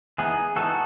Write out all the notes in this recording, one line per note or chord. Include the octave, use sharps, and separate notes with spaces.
E3 B3 D#4 G#4
E3 B3 D#4 F#4 A4